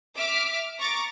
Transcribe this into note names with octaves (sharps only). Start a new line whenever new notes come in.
E5 D6 F6 B6
A#5 C#6 D6 A6 A#6